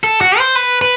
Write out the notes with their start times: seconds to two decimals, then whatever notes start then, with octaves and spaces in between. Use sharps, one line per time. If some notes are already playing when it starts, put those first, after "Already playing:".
0.04 A4
0.21 F#4
0.39 C5
0.55 B4
0.81 B4